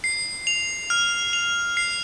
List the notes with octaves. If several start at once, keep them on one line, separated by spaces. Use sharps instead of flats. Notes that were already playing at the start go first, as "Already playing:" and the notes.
C7
F7
F6
F7
C7